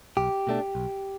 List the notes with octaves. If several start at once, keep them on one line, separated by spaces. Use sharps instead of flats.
B1 G4
B2 A3 D4
B1